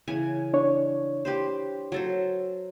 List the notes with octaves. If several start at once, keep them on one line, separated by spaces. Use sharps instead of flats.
C#3 E3 G#5
D4 C#5
G4 B4 C5
F#3 A4 C5